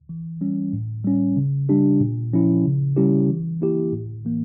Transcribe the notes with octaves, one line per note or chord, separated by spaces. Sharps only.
E3
G3 C#4
A2
G3 C#4
C#3
G3 D4 G4
A#2
F3 C#4 E4
C#3
G3 C#4 E4 G4
E3
A#3 E4 G4
A2
E3 A#3